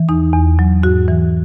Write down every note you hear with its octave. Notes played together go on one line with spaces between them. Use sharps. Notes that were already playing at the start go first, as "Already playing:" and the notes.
Already playing: E3
E2 D#4
E2
F#3
G#2 F#4
E3